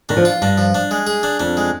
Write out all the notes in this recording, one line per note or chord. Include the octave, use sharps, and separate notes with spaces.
D#3 D4
F3
F4
G2 D4
F3
D4
G#3
G#4
D4
F2 D4
G#3